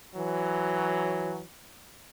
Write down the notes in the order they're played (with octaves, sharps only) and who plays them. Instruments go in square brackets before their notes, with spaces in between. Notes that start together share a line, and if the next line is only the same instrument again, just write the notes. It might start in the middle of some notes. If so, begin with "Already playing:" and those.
[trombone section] E3 F#3